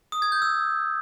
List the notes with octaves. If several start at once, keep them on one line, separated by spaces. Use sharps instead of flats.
D#6
G#6
G6
E6